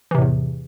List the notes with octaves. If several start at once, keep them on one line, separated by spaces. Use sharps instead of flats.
E2 A2 C3 E3